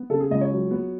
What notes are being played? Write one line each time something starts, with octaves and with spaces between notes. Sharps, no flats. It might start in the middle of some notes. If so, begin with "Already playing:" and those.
Already playing: B3
C#3 A4
G#4
C#2 D#5
C#5
F#3
B3